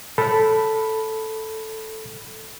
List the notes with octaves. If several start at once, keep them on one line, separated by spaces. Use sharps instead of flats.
A4 B5